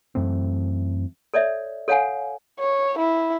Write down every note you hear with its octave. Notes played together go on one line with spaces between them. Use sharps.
F#2 E3 A3 C4
A4 C#5 D5 E5
A4 C#5 F5 F#5 G#5
C#5
E4